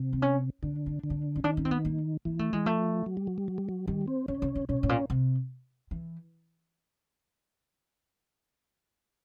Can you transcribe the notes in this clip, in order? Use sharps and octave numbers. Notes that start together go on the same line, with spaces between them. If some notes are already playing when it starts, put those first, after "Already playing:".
Already playing: C3
C4
C#4
D3 D4
D4
D3
D4
C#4
D#3 D4
C#4
C4
B3
A#3
E3 A#3
A3
E3 G#3
F3 A3
F#3
G3
F#3
G3
F#3
G3
F#3
D#3 G3
C4
D3 C#4
C#3
C#3
B2 C#4
A2
A#2
C3
E3